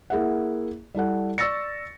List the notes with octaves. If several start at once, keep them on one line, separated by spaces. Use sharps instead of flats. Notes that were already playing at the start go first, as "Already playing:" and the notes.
A#3 E4 G#4 E5 F#5
G3 E4 A4 F#5
D5 C#6 E6 A6 A#6 C#7